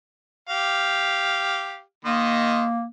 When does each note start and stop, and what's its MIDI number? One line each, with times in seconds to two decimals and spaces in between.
0.49 1.81 67
0.49 1.81 77
2.05 2.65 51
2.05 2.86 58
2.05 2.65 75
2.05 2.65 84